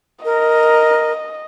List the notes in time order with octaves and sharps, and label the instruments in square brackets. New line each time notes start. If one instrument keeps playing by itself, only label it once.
[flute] A#4 [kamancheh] D#5